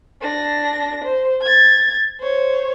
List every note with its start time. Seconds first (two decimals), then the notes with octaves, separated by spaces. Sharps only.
0.21 D4 A#6
1.04 C5
1.42 G#6 A6
2.20 C5 C#5